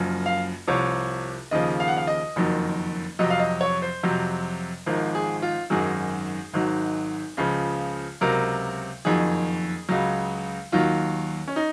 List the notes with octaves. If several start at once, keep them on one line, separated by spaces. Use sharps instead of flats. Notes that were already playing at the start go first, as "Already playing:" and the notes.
Already playing: F#1 F#2 F3
F5
C2 C3 F3 C#5
D#2 C#3 F3 D#5
F5
F#5
F5
D#5
F#1 F2 D#3 F#3
F2 C3 F#3 D#5
F5
D#5
C#5
C5
F2 C3 F#3
G#1 G#2 F3 A#4
G#4
F4
G#1 F#2 D#3 F#3 G#4
G#1 G#2 D#3 F#3
C#2 C#3 F3
C#2 C3 F#3 A#4
F#1 F2 D#3 F#3 G#4
C#2 C#3 F#3
D#2 D#3 F#3 F4
C#4
D#4